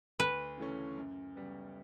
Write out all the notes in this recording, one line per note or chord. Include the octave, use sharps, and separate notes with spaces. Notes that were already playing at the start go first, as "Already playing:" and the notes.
D2 B4
C#3 E3 A3 C#4
F#2
C#3 G3 B3